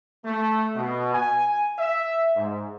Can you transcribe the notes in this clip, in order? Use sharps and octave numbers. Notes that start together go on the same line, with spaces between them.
A3
B2
G#5
E5
G#2